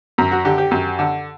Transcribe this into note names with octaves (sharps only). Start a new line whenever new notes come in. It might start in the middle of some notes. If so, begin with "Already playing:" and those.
F#2
F#4
D3 G4
G4
F#2
D3